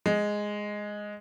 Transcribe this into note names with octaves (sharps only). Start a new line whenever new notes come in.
G#3